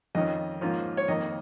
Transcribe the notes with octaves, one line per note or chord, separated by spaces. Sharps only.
F2 D#3 C#4 D#5
G#2 F3 A#3 C#4 F4
C#5
F2 D#3 A#3 D#5